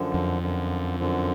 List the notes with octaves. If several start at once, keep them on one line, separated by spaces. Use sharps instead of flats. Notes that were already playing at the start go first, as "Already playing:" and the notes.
Already playing: F#2 D3 F3
F2
F#2 D3 F3
F#2 D3 F3